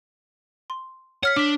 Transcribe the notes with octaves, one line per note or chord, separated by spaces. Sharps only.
C6
C#5 F#5 F6 B6
D4 D6 B6